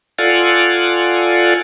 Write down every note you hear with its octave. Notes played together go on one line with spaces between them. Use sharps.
F4 A4 D5 F5 F#5 G#5